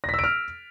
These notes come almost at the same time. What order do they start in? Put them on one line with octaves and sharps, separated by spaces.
A#6 B6 E6 D7 F6